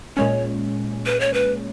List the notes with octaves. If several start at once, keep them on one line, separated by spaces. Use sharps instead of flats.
A#2 G#3 C#4 C#5
B4
C#5
B4